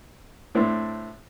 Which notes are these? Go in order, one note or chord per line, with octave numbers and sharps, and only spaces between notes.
A2 A3 C4 D4